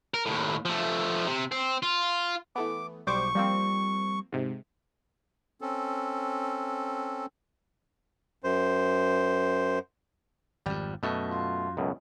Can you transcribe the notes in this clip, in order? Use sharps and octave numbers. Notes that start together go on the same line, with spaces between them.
A#4
D#2 A2
F3 A3
C3
C4
F4
E3 A3 B3 D6
B1 G3 C5 C#6 D6
F3 G3 A#3 C4
G#2 C3
C4 C#4 A4
F#2 C5
G#1 F2 G3
F#2 B2 A3
F4
C#2 F#2 B2